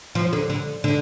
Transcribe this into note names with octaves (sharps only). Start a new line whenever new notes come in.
F3
D3
D3
D3